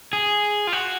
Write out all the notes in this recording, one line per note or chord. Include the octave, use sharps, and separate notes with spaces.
G#4
F4
F#4